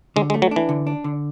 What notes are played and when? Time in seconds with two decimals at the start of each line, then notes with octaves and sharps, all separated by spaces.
0.16 D3 G#3
0.30 G#3
0.34 A3
0.42 F#3
0.51 D4
0.56 E3
0.69 D3
0.87 D4
1.04 D3